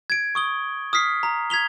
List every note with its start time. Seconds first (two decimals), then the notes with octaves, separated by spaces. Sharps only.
0.10 G#6 D7
0.35 C#6 D#6 G7
0.93 D#6 F6 B6 C7
1.23 A#5
1.50 G#6 B6 F7 G7